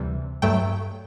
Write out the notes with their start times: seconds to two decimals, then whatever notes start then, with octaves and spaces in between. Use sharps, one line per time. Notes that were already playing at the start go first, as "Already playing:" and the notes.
Already playing: D2 C3 E3 G3
0.42 G2 F#3 A3 G5